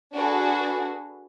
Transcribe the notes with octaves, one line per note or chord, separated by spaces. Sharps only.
D4 F#4 G#4 A4 B4